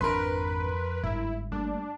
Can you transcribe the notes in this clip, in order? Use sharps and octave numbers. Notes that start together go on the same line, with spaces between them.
G#1 F2 D4 A#4 B4 B5 C6
G1 G#2 E4
G3 A3 A#3 D4